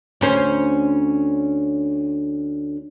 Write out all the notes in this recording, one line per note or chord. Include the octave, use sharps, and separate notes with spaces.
D2 C#4 C5